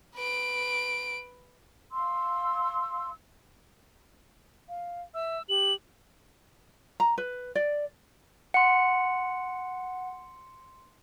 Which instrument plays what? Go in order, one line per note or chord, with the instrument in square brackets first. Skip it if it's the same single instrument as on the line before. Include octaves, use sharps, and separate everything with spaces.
[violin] B4 D7
[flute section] F5 C6 E6
[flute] F5
[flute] E5 [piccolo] E6
[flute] G4 [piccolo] F#7
[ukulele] A#5
B4
D5
[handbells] F#5 [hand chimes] C6 C#7